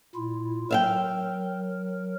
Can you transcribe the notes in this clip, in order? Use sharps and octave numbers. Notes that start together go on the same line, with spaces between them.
A#2 E4 F4
F#3 A#4 E5 F5 G5